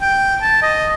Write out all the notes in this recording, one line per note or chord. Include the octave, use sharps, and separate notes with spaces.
G5
A5
D#5